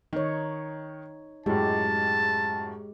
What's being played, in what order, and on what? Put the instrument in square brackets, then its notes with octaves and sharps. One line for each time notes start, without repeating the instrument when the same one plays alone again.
[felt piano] D#3 [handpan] D#4 C#5
[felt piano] F#2 A2 [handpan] G#3 G4 [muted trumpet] A5